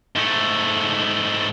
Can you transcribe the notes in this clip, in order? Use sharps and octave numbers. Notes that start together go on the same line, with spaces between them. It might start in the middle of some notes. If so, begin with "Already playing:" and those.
G#2 A3